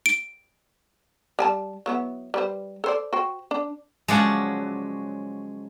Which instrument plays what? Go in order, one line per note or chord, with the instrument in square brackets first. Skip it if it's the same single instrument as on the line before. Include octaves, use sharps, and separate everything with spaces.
[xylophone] D7
[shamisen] G3 G#5 A5
F#3 B3 E4
G3 B4 C5
A4 C5 D5
F#4 C5 G5
D4
[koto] C#3 F3 F#3 [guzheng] G#3 D5 F#5